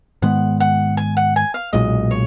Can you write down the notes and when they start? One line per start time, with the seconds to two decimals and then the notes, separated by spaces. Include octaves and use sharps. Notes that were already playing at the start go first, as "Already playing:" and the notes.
0.22 G#2 D#3 G#3 B3 F#5
0.60 F#5
0.97 G#5
1.17 F#5
1.36 G#5
1.54 F5
1.73 B1 A#2 G#3 D#5
2.11 C#5